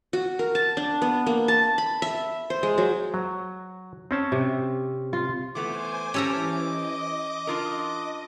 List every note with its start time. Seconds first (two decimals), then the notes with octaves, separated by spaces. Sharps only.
0.13 F#4
0.39 A#4
0.55 A5
0.77 D4
1.02 B3
1.27 A#3
1.48 A5
1.78 B5
2.02 E5
2.50 C5
2.63 G#3
2.78 F#3
3.14 F#3
4.11 C4 C#4 A5
4.32 C3
5.13 F4
5.55 E3 A3 B3 C5 G#5 D6
6.14 E3 C#4 G4 A4 C#5 G#5 A#5
6.57 D#5
7.47 D4 F4 A#4